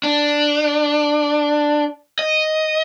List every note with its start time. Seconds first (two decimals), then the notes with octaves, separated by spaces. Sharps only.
0.03 D4
2.19 D#5